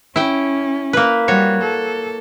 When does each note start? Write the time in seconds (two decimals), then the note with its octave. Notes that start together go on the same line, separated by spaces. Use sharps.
0.16 C#4 E4 G5
0.93 A#3 B4
1.28 G3 F#4 C#5
1.62 A4